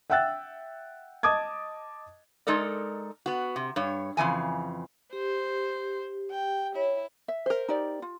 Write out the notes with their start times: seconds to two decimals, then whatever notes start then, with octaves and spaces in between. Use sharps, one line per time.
0.10 E5 F#5 G5 E6 F#6 A6
1.23 D#5 A5 D6 D#6 G#6
2.47 G#3 D#4 A4 A#4 D5
3.26 B3 F#4
3.56 C3
3.76 G2 C#5
4.17 F2 C#3 E3 G#5
5.13 G4 C5
6.31 G5
6.76 E4 C#5
7.28 E5
7.46 A#4 C5
7.68 D#4 G4 D5
8.02 F4